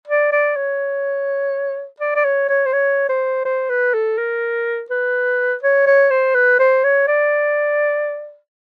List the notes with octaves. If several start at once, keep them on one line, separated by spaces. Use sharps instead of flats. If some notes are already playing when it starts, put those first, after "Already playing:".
D5
D5
C#5
D5
D5
C#5
C#5
C5
C#5
C5
C5
B4
A4
A#4
B4
C#5
C#5
C5
B4
C5
C#5
D5